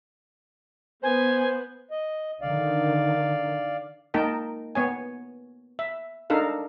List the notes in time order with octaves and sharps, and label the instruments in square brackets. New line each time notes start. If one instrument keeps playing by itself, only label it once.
[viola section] B3 [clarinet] C5 [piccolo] G#5
[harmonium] D#5
[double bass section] D3 D#3 [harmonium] D5 F5
[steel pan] A#3 D#4 A#4 G5 A5
B3 C#5 G#5
E5
D4 D#4 A4 A#4 F5